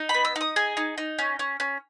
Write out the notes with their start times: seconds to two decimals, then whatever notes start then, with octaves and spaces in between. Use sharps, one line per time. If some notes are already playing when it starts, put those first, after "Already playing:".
Already playing: D#4
0.09 B5
0.14 B3
0.25 E6
0.36 D#4
0.41 D#6
0.56 G#4 G#5
0.77 D#4
0.98 D#4
1.19 C#4
1.39 C#4
1.60 C#4